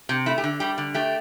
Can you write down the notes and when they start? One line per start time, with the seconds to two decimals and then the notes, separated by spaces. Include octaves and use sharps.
0.09 C3
0.26 A3 E4
0.38 G4
0.44 D3
0.60 G3 G4
0.78 D3
0.94 A3 G4